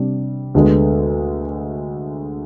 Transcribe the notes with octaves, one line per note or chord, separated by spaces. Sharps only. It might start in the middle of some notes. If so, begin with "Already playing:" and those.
Already playing: C3 G3 D4
D2 D3 G#3 B3